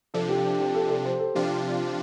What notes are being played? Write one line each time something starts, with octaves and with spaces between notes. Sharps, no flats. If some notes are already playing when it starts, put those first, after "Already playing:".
C3 F3 D4 A4
G4
G4
A4
A4
C5
A4
C3 F3 D4 F4 G4